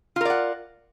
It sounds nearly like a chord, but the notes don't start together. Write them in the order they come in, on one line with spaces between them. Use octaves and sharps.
F4 A#4 D5 F#5